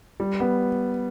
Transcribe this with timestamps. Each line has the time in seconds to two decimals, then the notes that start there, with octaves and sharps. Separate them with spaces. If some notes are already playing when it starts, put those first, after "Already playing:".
0.20 G3
0.40 B3